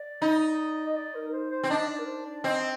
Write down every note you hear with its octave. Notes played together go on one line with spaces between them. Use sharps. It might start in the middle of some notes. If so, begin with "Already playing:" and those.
Already playing: D5
D#4
D#5
D5
A#4
A#4
C5
C5
C4
D4 D#5
D5
A#4
C5
D5
C4 D#5
D#5